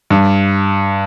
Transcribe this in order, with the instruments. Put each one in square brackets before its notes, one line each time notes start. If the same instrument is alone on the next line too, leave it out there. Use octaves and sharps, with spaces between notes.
[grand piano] G2